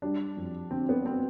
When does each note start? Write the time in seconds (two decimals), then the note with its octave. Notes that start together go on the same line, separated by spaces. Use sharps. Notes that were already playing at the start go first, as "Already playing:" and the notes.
0.02 G3 D4
0.37 F2
0.71 D3 C4
0.89 B3
1.06 C4